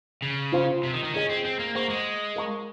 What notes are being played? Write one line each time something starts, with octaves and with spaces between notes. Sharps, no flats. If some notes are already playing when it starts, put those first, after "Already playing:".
C#3
F4 C5 F5 C6
C3
D#3
D#3
C#4 F4 G#4 D#5 G#5
C4
C4
A#3
A#3 G#4 C5 F#5 A#5 C#6
G#3
A#4 F5 A#5 C#6